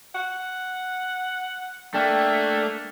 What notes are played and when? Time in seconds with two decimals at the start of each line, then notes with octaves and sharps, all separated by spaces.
0.15 F#5
1.94 A3 A#3 D4 G5